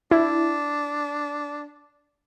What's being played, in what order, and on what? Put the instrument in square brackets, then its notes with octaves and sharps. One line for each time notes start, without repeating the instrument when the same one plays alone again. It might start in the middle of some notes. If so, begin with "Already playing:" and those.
[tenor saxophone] D4 [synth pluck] E4